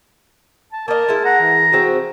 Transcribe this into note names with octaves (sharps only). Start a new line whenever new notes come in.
A5
A#3 A#4 D#5 A5
G#3 E4
F#5 A#5
E3
F3 G#3 C4 F#4